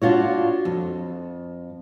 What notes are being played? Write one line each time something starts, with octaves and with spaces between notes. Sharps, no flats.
D4 F4 F#4 C#5
F2